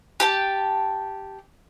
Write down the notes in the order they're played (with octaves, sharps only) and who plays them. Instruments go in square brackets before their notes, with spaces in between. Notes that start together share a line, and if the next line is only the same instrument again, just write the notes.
[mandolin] G4 G5 A5